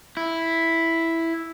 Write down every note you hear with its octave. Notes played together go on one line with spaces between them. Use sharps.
E4